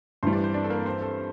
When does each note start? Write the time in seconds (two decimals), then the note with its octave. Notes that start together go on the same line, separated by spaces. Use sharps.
0.23 G2 E3 G3 C5 C6
0.33 D4 D5
0.43 C4 C5
0.54 D4 D5
0.64 A4
0.70 A#3 A#4
0.86 C4 C5
1.02 A4